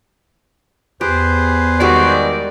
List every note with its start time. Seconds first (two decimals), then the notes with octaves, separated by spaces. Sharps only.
1.01 E2 G4 G#4 B4 C5
1.80 D#3 G3 G#3 F#4 D5